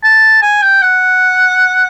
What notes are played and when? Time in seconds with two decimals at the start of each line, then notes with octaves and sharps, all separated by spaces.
0.04 A5
0.42 G#5
0.62 G5
0.82 F#5